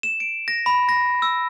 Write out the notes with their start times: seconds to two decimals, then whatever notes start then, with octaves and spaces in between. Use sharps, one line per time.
0.03 E7
0.20 D7
0.48 A#6
0.66 B5
0.89 A#6
1.22 E6